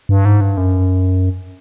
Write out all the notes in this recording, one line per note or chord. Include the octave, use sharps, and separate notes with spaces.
G2
G#2
G2
F#2